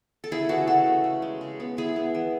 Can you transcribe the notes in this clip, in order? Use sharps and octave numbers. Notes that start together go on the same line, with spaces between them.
A4
C#3 E4 G#4
E3 F#4 A4
C#3 F#4 A4
A3
C#3
G#3
C#3
B3
B3 E4 G#4
B3
E3